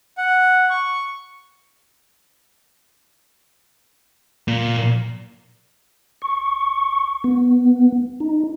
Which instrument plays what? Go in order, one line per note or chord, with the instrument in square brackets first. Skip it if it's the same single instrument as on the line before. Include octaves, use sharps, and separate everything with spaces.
[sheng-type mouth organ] F#5
C#6
[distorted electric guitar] A#2
[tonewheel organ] C#6
B3
D#4